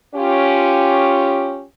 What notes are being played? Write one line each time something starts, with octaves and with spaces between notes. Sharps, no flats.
C#4 F4 G4